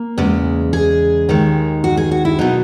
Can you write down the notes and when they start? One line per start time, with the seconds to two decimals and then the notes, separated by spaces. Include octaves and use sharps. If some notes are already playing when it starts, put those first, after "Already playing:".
Already playing: A#3
0.18 E2 C#3 G#3
0.73 G#4
1.29 D#2 D#3 G#3
1.84 F#4
1.97 G#4
2.11 F#4
2.25 E4
2.39 B2 F#3 D#4